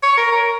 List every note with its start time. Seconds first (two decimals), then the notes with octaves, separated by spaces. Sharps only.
0.03 C#5
0.17 A#4
0.32 A#4